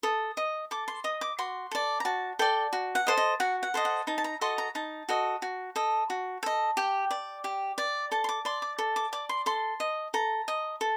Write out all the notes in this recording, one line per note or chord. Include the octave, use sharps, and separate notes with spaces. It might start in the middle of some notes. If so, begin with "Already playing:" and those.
A4 D#6
D#5
A4 D6
C6
D#5 D#6
D6
F#4 C6
A4 D5
A#5
F#4 A5
A4 D5 G5
F#4
F#5
A4 C5 D#5
D#5
F#4 F#5
F#5
A4 C5 D#5
F#5
D#4 A5
A5
A#5
F#4 A4 D#5 C6
A#5
D#4 A5
F#4 A4 D#5
F#4
A4 D#5
F#4
A4 D#5
G4 G5
D5
G4
D5
A4 A5
C6
D6
D5 C6
D6
A4
D6
D5 D6
C6
A4 C6
D#5
A4 A#5
D#5
A4